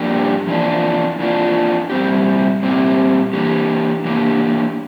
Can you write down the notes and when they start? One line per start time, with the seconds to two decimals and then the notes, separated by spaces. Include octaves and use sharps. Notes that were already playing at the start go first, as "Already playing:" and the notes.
Already playing: G2 F3 A#3 D4 G4
0.47 F2 E3 A#3 D4 F4
1.19 F2 E3 A#3 D4 F4
1.90 A#2 G3 C4 G4
2.62 A#2 G3 C4 G4
3.33 E3 A#3 D4 G4
4.05 E3 A#3 D4 G4